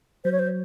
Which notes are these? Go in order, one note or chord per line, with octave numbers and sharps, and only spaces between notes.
F#3 C5
C#5
C5